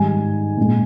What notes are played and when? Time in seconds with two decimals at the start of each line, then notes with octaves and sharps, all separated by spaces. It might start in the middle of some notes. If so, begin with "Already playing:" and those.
Already playing: G#2 D#3 G3 G#5
0.57 A#2 G#3